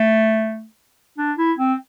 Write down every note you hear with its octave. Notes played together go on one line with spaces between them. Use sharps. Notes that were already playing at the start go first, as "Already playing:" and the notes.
Already playing: A3
D4
E4
C4